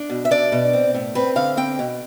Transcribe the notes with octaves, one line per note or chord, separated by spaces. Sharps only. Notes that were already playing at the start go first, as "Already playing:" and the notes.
Already playing: D4
B2
E5
D4 D5
B2
C4
A2
C4 B4
D3 F5
C4 G5
B2